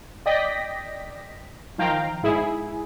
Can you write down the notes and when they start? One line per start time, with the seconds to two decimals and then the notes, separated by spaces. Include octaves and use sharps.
0.26 D5 D#5 G5 A#6 B6
1.78 D#3 F3 F5 G5 A#5
2.23 G#2 E4 G#4